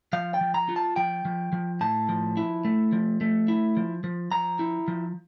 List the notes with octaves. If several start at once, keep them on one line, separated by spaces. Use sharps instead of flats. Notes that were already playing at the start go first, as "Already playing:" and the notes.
F3 F5
G5
F3
A#5
F4
A5
F3 G5
F3
F3
A2 A5
F3
E4
A3
F3
A3
E4
F3
F3
F3 A#5
E4
F3